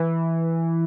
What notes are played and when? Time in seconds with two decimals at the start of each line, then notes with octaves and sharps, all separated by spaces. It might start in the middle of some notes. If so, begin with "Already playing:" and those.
Already playing: E3